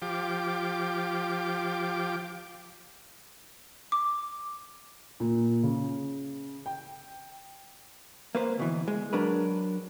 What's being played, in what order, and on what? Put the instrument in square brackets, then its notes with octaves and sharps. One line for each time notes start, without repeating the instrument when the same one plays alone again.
[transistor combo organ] F3 G4 D6
[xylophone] D6
[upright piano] A#2
C#3
G5
[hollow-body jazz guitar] A#3 B4 C5
D2 B2 E3
G#3
F#3 D4 A#4 B4